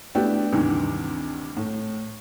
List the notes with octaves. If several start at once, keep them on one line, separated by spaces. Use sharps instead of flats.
A3 B3 D4 E4 F#4 G4
D2 G2 C3 D#3 E3
A2